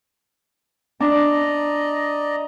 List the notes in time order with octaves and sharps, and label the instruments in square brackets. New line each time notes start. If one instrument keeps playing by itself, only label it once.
[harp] D4 [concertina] D5 D#5 A#5